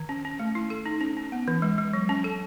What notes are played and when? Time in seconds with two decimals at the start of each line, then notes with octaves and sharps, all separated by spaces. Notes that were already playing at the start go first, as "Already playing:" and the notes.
Already playing: D#3
0.09 C#4
0.25 C#4
0.39 A3
0.55 E4
0.70 A4
0.86 D#4
1.01 C#4
1.17 C#4
1.32 B3
1.48 E3
1.62 G#3
1.78 G#3
1.94 F#3
2.09 C#4
2.24 A4